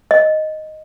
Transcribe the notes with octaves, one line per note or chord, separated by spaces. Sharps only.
D#5